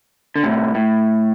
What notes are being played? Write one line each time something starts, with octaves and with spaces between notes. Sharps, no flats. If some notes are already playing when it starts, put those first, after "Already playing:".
D3
A2 C3
A2